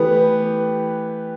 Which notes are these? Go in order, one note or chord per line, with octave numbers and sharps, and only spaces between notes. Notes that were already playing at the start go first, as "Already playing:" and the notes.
Already playing: E3 A3 B3 G4 B4